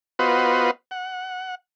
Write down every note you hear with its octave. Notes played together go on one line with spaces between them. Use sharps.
B3 F4 F#4 B4 C5 D#5
F#5